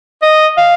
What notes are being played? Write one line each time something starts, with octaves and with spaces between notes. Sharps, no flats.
D#5
F5